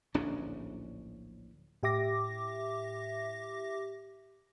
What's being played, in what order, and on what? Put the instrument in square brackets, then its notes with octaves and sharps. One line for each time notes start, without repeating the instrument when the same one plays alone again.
[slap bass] D1 A#1 C#4 D4
[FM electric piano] A2 G4 E5 D6 A#6